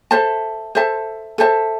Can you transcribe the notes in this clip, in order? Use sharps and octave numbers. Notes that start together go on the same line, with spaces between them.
A4 C5 E5 A5
A4 C5 E5 A5
A4 C5 E5 A5